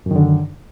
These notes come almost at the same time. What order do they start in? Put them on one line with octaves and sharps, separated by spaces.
F#2 D#3 D3